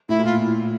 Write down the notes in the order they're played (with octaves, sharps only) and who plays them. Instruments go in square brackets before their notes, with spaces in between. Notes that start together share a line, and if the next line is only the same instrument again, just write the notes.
[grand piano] A2 [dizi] E4
[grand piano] A#2
[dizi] F4